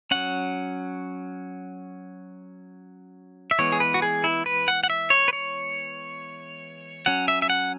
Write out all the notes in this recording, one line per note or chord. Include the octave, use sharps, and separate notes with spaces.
F#3 C#4 F#5
E5
E3 G#3 B3 C#5
G#4
B4
F#4
G#4
E4
B4
F#5
F#5
E5
C#5
B4
C#5
F#3 C#4 F#5
E5
E5
F#5